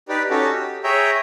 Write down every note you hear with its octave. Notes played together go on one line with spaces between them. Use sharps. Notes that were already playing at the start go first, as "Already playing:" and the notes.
D#4 G4 B4 D5
C#4 D#4 F#4 G4 A4
G4
G#4 C#5 E5 G5 A#5